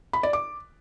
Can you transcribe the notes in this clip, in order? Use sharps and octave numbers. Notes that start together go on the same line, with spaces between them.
B5
D5
D6